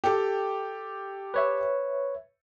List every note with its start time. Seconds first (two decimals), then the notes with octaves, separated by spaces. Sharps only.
0.04 G4 A4
1.34 B4 C#5 E5